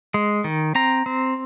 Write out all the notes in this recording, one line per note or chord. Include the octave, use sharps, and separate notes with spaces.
G#3
D#3
C4 A#5
C4